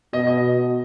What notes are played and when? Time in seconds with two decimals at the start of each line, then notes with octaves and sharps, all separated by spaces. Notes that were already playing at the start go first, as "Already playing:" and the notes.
0.13 B2 D#5
0.27 D#5